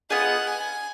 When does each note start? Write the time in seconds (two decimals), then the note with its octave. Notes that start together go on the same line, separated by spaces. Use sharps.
0.10 B3 F4 G#4 D#5 F#5
0.47 G#5